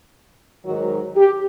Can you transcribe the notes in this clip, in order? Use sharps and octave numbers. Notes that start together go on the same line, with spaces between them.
G#2 D#3 F#3 F#4
G4